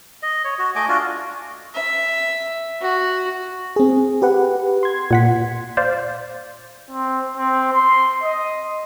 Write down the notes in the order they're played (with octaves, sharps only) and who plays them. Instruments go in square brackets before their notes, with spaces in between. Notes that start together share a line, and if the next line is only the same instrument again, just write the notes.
[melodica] D#5
C#5
F#4
A3 D#5 G#5 D6
D4 F4 F#4
[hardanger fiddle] E5
F#4
[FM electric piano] C4 G#4
G4 B4 F#5
C6 G#6
[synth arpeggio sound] A#2 F#5 B6
C5 D5 F5
[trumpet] C4
C4
C6
D#5